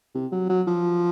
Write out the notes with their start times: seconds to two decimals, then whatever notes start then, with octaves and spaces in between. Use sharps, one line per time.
0.14 C3
0.32 F#3
0.49 F#3
0.67 F3